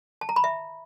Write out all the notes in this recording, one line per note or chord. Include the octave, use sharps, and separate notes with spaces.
A5
A#5
B5
E5